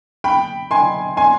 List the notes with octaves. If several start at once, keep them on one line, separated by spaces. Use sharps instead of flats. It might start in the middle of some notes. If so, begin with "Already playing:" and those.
G5 B5
G#5 C6
G#5 C6